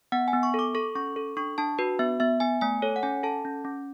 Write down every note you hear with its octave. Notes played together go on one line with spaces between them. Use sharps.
B3 F#5
G#5
B3
C#6
A4 D6
A4 C#6
C#4 C#6
A4
D4 C#6
D4 A5
F#4 B4
B3 E5
B3 E5
B3 G#5
A3 G#5
A4 C#5
F#5
C#4 G#5
A4 A5
C#4
C#4